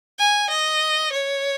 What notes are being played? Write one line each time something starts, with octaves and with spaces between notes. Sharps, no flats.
G#5
D#5
C#5